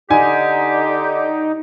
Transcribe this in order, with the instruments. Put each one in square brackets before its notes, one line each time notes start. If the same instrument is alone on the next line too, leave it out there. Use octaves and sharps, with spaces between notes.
[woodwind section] D3 G4 [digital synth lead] D#4 [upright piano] G#5